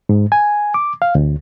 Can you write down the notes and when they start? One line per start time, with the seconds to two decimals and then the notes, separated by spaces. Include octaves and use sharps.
0.09 G#2
0.32 G#5
0.74 D6
1.02 F5
1.15 D2